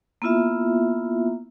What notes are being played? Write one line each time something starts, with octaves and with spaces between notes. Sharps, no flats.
A#3 B3 E4 F4 E5